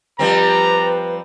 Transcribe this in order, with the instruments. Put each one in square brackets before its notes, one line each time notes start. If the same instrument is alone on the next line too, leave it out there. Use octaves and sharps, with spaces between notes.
[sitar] F3 G3 C4 [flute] B4 [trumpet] A#5